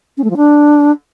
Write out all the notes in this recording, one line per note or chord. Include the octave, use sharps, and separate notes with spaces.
C#4
A3
F3
D4